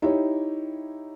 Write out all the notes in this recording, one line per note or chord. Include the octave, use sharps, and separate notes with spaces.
D#4 E4 G4 C#5